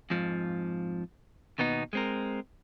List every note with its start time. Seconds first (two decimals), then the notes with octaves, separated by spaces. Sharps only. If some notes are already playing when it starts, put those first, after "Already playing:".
0.10 F2 G#2 F3
1.58 D#2 B2 B3 D#4
1.93 G#3 C4 A#4